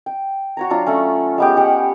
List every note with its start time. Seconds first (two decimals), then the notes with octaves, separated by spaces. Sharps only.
0.06 G5
0.57 F#4 C#5 A#5
0.70 F#3 D4 F4
0.86 A3 C#4
1.38 G#3 B3 G4
1.57 G4 F#5 G5